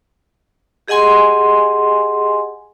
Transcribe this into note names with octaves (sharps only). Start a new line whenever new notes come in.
G4 G#4 D#5 F#5 G#5 C6